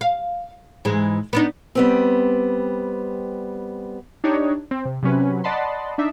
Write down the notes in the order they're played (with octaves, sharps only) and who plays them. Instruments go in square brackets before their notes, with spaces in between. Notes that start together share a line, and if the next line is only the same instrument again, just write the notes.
[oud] F5
G#2 E3 G#3
B3 D4 D#4
[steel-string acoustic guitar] G3 B3 C4
[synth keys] D4 D#4 G4 C#5
C4
C3
C3 F#3 C#4 B4
D5 D#5 F#5 A5 B5 C6
D4 D#4 E5